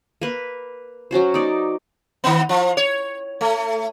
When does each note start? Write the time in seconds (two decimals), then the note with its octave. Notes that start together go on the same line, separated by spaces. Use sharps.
0.22 A#3 B4
1.11 F#3 C#4 F#4 C5
1.34 D#4 D5
2.24 D#3 B3
2.49 F3
2.77 C#5
3.41 A3